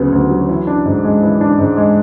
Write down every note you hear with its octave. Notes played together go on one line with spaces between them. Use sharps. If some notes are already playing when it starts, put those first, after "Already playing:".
Already playing: D2 C#3 F#3 B3
D2
F#3
E3
D4
G#2
G#3
E3
D4
G#2
G#3